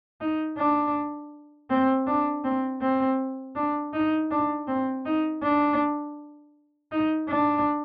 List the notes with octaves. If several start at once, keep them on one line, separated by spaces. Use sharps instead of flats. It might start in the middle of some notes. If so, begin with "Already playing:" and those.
D#4
D4
C4
D4
C4
C4
D4
D#4
D4
C4
D#4
D4
D#4
D4